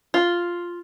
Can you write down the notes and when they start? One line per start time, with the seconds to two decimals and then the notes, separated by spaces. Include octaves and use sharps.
0.14 F4